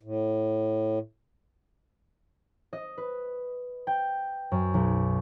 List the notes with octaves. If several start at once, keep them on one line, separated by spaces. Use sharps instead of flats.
A2
D#5
B4
G5
F#2
B1